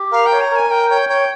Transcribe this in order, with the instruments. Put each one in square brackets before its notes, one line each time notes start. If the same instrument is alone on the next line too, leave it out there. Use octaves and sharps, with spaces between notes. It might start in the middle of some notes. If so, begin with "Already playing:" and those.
Already playing: [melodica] G4
[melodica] A#4 [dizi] F5
[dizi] G5
[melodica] C#5
[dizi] A#5
[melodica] A#4 [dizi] G#5
[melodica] A#4 [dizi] G5
[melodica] C#5 [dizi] G5
[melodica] C#5 [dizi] G5